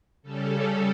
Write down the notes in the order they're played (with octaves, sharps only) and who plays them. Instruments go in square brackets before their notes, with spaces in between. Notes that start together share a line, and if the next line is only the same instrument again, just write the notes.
[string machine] C#3 G3 C#4 A4